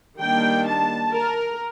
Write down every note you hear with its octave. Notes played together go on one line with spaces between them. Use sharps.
D#3 G3 A#3 D4 G5
A5
A#4